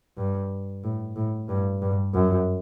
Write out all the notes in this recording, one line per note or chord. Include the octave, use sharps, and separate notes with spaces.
G2
A2
A2
G2
G2
F#2